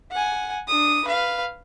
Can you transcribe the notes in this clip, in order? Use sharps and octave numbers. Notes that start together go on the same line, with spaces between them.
F#5 G#5
D4 D#6
B4 F5